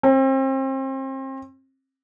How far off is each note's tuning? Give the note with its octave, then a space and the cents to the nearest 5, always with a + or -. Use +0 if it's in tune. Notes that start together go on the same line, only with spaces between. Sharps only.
C4 +35